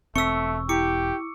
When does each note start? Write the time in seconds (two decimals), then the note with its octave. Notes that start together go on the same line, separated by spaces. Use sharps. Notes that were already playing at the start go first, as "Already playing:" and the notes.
0.16 E1 A3 C4 C#6 E6 B6 C#7
0.69 E4 G4 D6 C#7